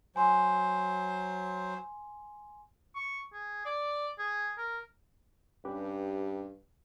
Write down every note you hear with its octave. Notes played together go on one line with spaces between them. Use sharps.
F#3 C5 G#5 C6
C#6
G#4
D5
G#4
A#4
G2 C#4 G4 B4